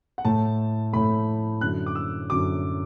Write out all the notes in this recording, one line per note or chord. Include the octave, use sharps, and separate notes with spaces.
F#5
A2 A3 A5
A2 A3 B5
F#2 D3 F#3 F#6
D6
E6
F#2 D3 F#3 D6